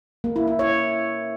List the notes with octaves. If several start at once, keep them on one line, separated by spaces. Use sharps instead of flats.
A#3
E4
E4
C#5